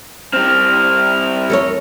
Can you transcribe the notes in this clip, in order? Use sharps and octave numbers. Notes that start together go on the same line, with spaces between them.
G3 C4 F6
A4 A#4 C#5